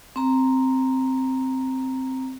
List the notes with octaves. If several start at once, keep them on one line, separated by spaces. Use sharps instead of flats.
C4 A#5